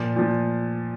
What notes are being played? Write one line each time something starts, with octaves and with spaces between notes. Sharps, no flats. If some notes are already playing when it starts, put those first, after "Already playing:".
Already playing: A#2 F3
A#2 F3